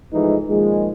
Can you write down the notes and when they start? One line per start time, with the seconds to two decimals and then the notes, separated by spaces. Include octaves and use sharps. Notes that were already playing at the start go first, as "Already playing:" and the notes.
0.13 G#2 E3 F3 G#3 A3 D#4
0.48 A#2 D#3 F3 G#3